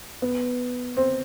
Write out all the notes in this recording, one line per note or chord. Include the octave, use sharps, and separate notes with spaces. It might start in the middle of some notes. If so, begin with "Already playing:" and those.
B3
C4